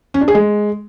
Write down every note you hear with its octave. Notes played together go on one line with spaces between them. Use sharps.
C#4
D4
G#4
G#3